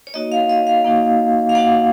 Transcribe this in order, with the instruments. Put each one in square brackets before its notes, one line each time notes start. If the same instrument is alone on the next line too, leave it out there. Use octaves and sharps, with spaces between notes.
[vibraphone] C#5
A#3 D#4 F#4 D#5
F5
D#5
F5
A#3 D#4 F#4
F5
A#3 D#4 F#4 F#5